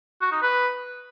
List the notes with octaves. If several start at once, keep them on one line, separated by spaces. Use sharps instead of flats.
F#4
D#4
B4